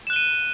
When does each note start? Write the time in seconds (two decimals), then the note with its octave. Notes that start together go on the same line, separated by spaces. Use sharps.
0.07 E7
0.10 F#6
0.13 G7
0.16 D#7